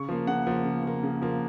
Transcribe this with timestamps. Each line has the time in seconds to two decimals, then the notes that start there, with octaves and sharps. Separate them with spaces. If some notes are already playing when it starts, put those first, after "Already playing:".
Already playing: C#3 C#6
0.08 F3 A#3
0.27 C#3 F#5
0.47 F3 A#3
0.65 C#3
0.83 F3 A#3
1.03 C#3
1.22 F3 A#3